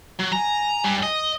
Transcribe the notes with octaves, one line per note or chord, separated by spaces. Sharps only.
F#3
G#5 A#5
G2 G3
D#5